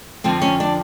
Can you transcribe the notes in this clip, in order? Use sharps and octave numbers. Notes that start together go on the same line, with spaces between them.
F2 D3 F3 C4
C#4
D4